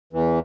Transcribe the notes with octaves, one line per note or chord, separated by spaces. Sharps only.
E2 E3